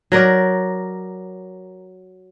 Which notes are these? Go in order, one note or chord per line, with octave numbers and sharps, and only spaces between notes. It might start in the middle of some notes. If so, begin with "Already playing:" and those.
F#3 A#4 D5